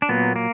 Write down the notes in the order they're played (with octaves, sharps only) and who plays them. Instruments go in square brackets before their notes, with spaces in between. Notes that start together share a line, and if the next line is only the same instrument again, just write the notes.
[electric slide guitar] D4
A#2 F#3 A#3 B3
A#3